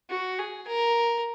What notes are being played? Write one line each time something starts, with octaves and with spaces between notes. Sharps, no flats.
F#4
G#4
A#4